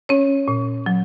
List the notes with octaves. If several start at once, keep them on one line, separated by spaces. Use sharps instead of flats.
C#4 C#5
A#2
F#3